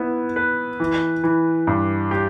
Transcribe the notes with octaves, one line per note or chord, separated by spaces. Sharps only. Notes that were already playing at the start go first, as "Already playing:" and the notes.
Already playing: B3 E4
B4
E3
E3
G2
G4